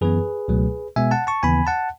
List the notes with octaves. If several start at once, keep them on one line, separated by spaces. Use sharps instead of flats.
F#2 E3 B3 G#4 B4
C#2 B2 F#3 A3
B2 G#3 B3 E5 G#5
F#5 A5
A5 C#6
D#2 C#3 E3 B3 G#5 B5
F#5 A5